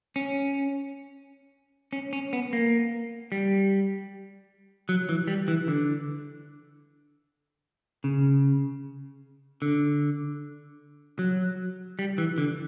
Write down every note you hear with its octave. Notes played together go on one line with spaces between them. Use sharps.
C#4
C#4
C#4
B3
A#3
G3
F#3
E3
G3
E3
D3
C#3
D3
F#3
G3
E3
D3